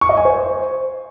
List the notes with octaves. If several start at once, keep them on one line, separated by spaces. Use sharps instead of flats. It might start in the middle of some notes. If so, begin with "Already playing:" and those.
C#6
D#5
G#5
C5